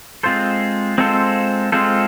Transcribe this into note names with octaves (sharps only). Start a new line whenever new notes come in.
G#3 C4 F4 A4 C5
G#3 C4 F4 A4 C5
G#3 C4 F4 A4 C5